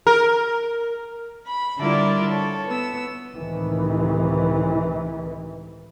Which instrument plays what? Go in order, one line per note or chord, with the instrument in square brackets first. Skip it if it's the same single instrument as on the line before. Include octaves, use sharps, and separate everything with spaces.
[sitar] A#4
[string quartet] B5
D3 G3 E4 F4 A#4 D5
A4 C#5
B3 E6
[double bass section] C#2 A2 C3 D#3 E3